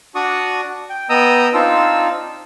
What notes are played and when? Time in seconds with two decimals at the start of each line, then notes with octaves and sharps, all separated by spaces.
0.15 D4 F#4 D5 C#6 D#6
0.90 G5
1.09 B3 D#5 G5 A#5 D#6 E6
1.53 C4 D4 D#4 F4 E6